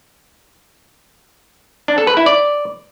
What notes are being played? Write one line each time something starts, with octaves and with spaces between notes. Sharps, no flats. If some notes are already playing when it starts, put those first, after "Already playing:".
D4
A4
B4
E4
D5